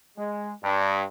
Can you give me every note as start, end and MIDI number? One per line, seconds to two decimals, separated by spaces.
0.17 0.52 56
0.64 1.03 43